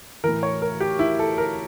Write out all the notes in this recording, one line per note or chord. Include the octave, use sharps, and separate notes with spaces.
A2 E3 A#4
C#5
A#4
G4
E4
A4
A#4